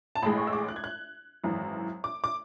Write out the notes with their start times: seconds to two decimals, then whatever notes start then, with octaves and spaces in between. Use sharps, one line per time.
0.15 A5
0.22 A1 A2 G#3 B5
0.37 C#6
0.47 E6
0.53 D6
0.69 F#6
0.76 G#6
0.84 F#6
1.44 G#1 F#2 E3
2.04 D6
2.24 D6